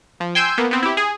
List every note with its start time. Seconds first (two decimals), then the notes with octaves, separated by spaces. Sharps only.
0.20 F3
0.35 G5 G#5 C6 E6 G6
0.58 A#3 B3
0.71 B3 C4
0.83 E4 G4
0.97 G#4